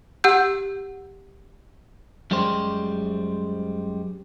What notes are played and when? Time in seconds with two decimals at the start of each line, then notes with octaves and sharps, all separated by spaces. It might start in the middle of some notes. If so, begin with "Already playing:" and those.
0.24 G4 F#5 E6 G6
2.31 F#2 G3 G#3 G4 C5